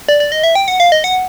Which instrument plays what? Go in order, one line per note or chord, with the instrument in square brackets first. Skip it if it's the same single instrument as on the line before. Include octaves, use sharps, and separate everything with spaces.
[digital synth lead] D5
D5
D#5
E5
G5
F#5
F5
D#5
F#5